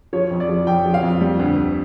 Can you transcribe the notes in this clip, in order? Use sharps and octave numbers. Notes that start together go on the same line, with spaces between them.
F3 C#5
F2
D5
F3
F2 G5
F3
F5
F2
G3
D2
D2